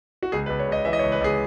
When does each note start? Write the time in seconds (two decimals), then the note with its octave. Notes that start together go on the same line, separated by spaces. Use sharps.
0.23 F#4
0.32 C#2 G#4
0.46 B4
0.50 C#2
0.59 C#5
0.68 C#2 D#5
0.85 E3 E5
0.93 D#5
0.99 C#5
1.03 C#2
1.12 B4
1.21 C#2 G#4